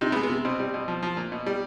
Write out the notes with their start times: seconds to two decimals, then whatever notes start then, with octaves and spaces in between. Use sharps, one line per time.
0.01 C3 D#4
0.12 B3
0.16 G#3
0.23 B3
0.30 C3
0.45 B2 C4
0.59 G3
0.74 B2
0.88 F3
1.03 F3
1.17 A#2
1.32 B2
1.46 G3